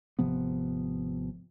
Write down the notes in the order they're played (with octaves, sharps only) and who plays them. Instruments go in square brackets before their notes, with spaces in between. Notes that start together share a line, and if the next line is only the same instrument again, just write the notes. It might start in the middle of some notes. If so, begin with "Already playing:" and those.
[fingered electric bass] G#1 C3 F3 B3